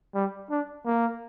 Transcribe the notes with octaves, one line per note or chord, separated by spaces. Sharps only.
G3
D4
A#3